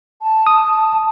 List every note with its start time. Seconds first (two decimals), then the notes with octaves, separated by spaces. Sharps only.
0.22 A5
0.47 D#6